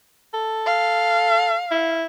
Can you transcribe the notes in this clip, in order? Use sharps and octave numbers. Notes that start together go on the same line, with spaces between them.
A4
F5
E4